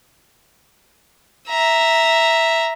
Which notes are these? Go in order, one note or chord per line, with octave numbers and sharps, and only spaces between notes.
E5 A#5